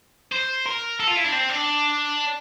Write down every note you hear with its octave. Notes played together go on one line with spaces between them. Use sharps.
C5
A#4
A4
F4
E4
D4
C4
D4